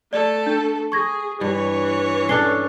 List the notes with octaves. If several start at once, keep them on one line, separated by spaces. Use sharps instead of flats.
A3 A4 D5
D4
G#4 C#6 G#6 A#6
G2 E3 C#5
C#4 D4 A4 C7 G7